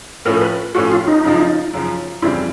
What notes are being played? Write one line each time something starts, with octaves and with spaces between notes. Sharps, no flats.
A2 F3 A3 C#4 A#4
B4
A2 F3 A3 C#4 F#4
F4
D#4
F#2 C#3 F3
F#2 C#3 F3
F2 C#3 E3 G3 C4 E4